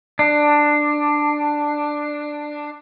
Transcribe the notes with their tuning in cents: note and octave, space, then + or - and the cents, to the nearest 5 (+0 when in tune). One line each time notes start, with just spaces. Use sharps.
D4 +10